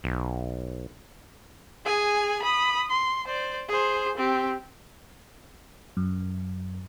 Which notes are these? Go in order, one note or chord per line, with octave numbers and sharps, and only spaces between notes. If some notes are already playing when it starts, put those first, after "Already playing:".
B1
G#4 G#5
B5 D#6
C6
C5 D5
G#4 C5
C4 G4
F#2